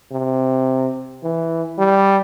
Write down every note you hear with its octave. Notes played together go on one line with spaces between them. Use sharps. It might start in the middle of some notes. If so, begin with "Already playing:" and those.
C3
E3
G3